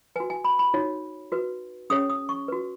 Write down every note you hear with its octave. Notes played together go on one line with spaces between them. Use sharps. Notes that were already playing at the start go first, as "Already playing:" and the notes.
F#4 B4 G#5
G#5
B5
B5
D#4 F#4 C#5
F#4 B4
C#4 G#4 C#5 D#6
D#6
C#6
F#4 B4